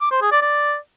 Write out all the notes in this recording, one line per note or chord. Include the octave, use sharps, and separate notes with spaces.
D6
C5
G#4
D5
D5